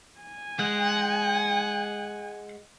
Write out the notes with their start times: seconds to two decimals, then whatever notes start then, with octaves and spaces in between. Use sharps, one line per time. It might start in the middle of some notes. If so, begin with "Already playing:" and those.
0.20 G#5
0.59 G#3 F#5